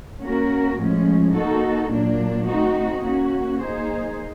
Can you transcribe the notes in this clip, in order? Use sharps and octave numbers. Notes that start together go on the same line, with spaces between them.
A#3 C#4 F#4 A#4
A2 F3 G#3 C#4
A#3 D#4 F#4 A4
A#2 F#3 A#3 D4
A3 C4 D#4 F#4
A#3 C#4 F#4
A#3 D#4 G#4 C5